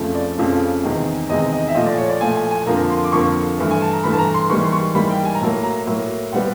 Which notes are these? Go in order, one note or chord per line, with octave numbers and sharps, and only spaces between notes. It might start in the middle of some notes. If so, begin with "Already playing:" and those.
Already playing: F2 C#3 F3 A3
D5
F2 C#3 F3 A3
E2 C3 D#3 G#3
E2 C3 D#3 G#3 D#5
D#5
E5
A#2 F3 A3 D#5
D5
C#5
D5
A#2 F3 A3 G#5
G#5
G#5
F2 D3 F3 A#3 A#5
C6
D6
F2 D3 F3 A#3 C#6
G2 E3 A3
G#5
A5
A#5
G2 E3 A3 B5
A5
A#5
C6
G#2 E3 G3 A#3 C#6
C6
C#6
G#2 E3 G3 A#3 B5
G5
G#5
A#5
A2 F#3 A#3 A5
A#5
A2 F#3 A#3
A#2 G3 B3 F#5